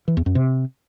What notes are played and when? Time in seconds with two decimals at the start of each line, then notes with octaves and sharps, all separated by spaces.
0.08 E3
0.17 E2
0.26 F#2
0.35 C3